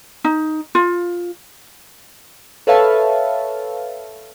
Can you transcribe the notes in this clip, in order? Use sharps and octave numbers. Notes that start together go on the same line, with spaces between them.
D#4
F4
A4 B4 C#5 E5 F5 A5